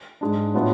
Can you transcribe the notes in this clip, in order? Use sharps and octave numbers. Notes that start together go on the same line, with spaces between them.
G#2 G#3 D4
A2 F#3 B3 D4 F4